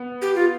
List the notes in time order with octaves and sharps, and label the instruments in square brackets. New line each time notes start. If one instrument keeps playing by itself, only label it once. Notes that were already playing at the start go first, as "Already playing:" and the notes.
Already playing: [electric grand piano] B3
[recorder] G4
F4